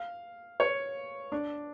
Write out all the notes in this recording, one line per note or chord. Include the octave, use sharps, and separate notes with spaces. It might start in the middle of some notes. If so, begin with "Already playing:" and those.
Already playing: F5
C#5
D4